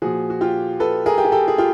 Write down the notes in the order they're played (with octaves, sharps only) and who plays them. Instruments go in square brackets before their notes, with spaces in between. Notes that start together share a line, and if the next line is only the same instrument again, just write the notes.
[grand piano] A#2 F3 F#4 G#4
F#4
F4 G4
A4 B4
G#4 A#4
G4
G#4
G4 A4
G#4
F4 G4